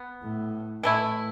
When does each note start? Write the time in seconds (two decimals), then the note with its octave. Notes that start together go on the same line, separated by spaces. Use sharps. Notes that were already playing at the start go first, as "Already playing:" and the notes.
Already playing: B3
0.22 A2
0.83 A2 E3 A3 E4